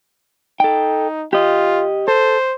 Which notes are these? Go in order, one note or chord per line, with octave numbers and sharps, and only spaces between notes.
D#4 A4 G5
F4 G4 D#5
A4 C5